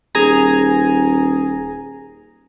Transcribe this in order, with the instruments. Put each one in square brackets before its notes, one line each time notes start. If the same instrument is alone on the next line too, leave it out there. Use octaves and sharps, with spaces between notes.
[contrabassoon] D#1 [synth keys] G#4 G#5 A#5